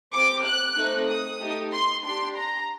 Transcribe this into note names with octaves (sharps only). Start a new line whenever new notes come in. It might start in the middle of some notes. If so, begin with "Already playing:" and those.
C4 G4 D6
F#6
A3 C4 D#4
D#6
A3 D#4 G4
C6
D4 G4 C6
A#5